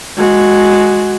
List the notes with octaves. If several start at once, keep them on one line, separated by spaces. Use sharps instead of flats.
G#3 F#4